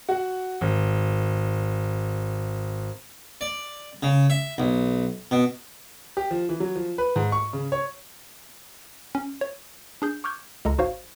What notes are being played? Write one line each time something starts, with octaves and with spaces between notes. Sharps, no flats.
F#4 F#5
G#1
D5
C#3
E5
B1
B2
G4
F3
E3
F#3
F3
B4
G#2
C#6
C#3
C#5
C#4
C#5
D4 G#4 G6
C#6 D6 F6 G6 G#6
C#2 G#3 A4 A#5
G#1 D#4 F#4 C5 C#5 F5